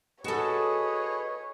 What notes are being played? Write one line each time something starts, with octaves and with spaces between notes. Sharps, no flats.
F#4 G#4 A4 B4 C#5 D#5